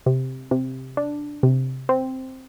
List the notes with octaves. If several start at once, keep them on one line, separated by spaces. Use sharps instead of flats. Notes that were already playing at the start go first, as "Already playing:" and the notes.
C3
C3
D4
C3
C4